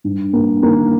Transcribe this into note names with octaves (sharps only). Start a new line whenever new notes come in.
G2
G2 A#3
D#3 A#3